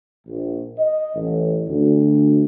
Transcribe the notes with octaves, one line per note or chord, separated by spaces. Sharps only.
A#1
D#5
A1
D2